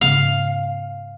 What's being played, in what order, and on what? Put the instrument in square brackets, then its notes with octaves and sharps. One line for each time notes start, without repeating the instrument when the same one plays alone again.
[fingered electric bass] G#2 C#3 B3 [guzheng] F5